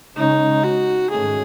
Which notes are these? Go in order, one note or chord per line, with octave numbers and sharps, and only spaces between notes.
C#3 G#3 C#4 D#4
F#4
G#2 D#3 A3 C#4 G#4